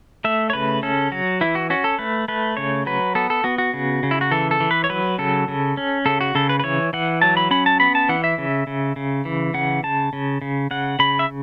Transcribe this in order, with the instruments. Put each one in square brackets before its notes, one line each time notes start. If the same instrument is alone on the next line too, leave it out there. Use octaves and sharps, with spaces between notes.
[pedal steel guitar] A3 E5
C#5
C#3 B4
C#4 A4
F#3 F#4
E3 E4
F#4
C#4 F#4
A4
A3 B4
A3 B4
C#3 C#5
F#3 B4
B3 A4
A4
B3 F#4
F#4
C#3
C#3
E4
F#4
E3 A4
A4
E3
B4
C#5
F#3 B4
C#3 A4
C#3
C#4
C#3 A4
F#4
C#3 A4
B4
B4
E3 C#5
E3 F#5
F#3 A5
B5
C#4 B5
A5
B3 B5
A5
E3 F#5
E5
C#3
C#3
C#3
E3
C#3 F#5
C#3 A5
C#3
C#3
C#3 F#5
C#3 B5
E5